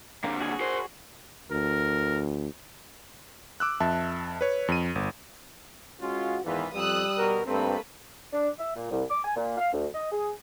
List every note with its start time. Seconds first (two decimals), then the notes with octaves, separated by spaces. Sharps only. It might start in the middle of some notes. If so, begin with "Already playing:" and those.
0.24 A#2 D3 A#3
0.40 F#4 G#4 C#5
0.61 A#4 C5
1.51 D2 A#4
3.60 D6 E6 F#6
3.80 F2 E5 A5
4.41 B4 C#5
4.68 F2 D#7
4.95 G1
6.01 G#3 C#4 F4 F#4
6.45 E2 G#2 D#3 E3 F4 B4
6.74 F2 G3 D#6 E6 F#6
7.17 B2 F#4 A#4
7.46 G2 A3 A#3 C4 B4
8.33 D4
8.59 E5
8.75 A#2
8.91 C2
9.10 D6
9.24 G#5
9.36 A#2
9.58 F5
9.72 D2
9.94 D#5
10.12 G#4